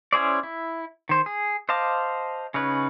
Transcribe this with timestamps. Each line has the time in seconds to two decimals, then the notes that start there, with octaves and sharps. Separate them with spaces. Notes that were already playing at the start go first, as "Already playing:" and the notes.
0.13 C#4 E4 G#4 C5 D5
0.43 E4
1.09 D#3 C5
1.26 G#4
1.69 C5 D#5 F5 A5 D6
2.54 C#3 C#4 D#4 B4